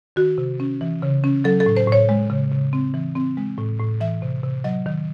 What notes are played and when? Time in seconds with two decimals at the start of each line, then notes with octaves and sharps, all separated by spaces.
0.16 D#3 F#4
0.38 C3
0.60 C#4
0.81 E3
1.02 C#3
1.24 C#4
1.44 F#3 A4
1.60 A4
1.66 A2
1.77 C5
1.88 A2 C#5
2.09 G#3
2.30 C#3
2.52 C#3
2.73 C4
2.94 E3
3.15 C4
3.37 G#3
3.58 A2
3.79 A2
4.00 E3 E5
4.22 C3
4.44 C3
4.64 F#3 D#5
4.86 D#3